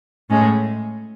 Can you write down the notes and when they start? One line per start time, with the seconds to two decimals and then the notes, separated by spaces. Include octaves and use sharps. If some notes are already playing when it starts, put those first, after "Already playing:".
0.30 A2 G#3 C#4